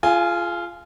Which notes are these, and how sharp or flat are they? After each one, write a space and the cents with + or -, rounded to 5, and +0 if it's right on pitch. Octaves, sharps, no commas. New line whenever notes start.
F4 -15 G#4 +40 G#5 +0